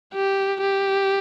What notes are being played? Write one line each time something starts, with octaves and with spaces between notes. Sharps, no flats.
G4
G4